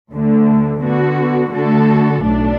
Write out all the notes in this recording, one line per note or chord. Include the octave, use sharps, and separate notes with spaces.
D2 D3 A3
D3 B3 F#4
D3 A3 F#4 A4
B1 A2 A3 D4